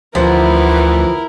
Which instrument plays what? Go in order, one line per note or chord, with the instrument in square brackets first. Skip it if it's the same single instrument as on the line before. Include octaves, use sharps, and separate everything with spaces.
[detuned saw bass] D2 [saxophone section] E3 B3 [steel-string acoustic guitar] F3 [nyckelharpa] E4 A#4